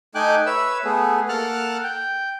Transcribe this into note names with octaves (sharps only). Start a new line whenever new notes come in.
A3 D#4 G5 G#5 D6 F#6
B4 C#5 E5 E6
A3 B3 G#4
A#3 A4 F#5 A5 F6 F#6
G5